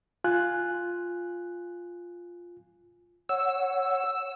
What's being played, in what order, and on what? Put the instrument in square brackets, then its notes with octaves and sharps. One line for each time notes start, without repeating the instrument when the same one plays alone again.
[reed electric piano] F4 G#5 F#6
[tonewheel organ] C#5 F#5 [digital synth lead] E6